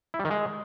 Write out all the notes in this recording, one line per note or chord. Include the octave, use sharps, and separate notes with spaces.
E4
G3
D#3
G#3